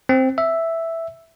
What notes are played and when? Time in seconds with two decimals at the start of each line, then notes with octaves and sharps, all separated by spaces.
0.09 C4
0.38 E5